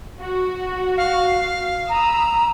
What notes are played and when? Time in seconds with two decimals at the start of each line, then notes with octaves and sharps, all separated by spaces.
0.20 F#4
0.97 F5
1.89 A#5 B5 D#6 E6